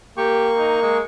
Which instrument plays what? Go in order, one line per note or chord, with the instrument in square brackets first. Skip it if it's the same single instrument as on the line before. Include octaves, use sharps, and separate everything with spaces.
[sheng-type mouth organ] A#3 C#6 [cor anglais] G4
[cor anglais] D#4
G#3